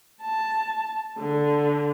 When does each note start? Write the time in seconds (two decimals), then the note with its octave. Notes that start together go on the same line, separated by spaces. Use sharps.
0.21 A5
1.18 D3